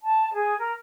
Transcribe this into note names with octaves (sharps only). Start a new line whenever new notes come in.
A5
G#4
A#4